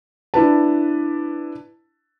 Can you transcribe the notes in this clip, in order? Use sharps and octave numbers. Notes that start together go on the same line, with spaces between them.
D4 E4 B4 A5